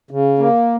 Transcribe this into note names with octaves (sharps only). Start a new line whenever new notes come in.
C#3
A#3